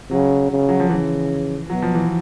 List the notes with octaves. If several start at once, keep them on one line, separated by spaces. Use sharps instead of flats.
C#3 F#3
C#3
F#3
F3
C#3 E3
B2 F#3
F3
E3